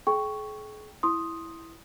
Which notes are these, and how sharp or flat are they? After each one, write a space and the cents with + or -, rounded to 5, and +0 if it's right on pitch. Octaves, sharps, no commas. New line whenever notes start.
G#4 +40 G5 -5 C#6 +0
E4 +0 C6 +15 D#6 +0